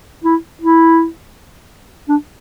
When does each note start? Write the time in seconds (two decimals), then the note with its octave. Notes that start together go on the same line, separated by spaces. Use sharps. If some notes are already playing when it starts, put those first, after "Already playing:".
0.25 E4
0.62 E4
2.09 D4